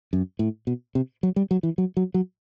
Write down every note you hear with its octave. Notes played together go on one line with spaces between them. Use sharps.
F#2
A2
B2
C3
F#3
G3
F#3
E3
F#3
F#3
F#3